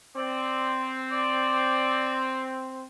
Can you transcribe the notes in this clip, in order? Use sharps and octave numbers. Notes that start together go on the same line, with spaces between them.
C4 D5
D5